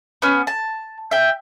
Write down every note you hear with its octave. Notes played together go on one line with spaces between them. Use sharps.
B3 C#4
A5
E5 G5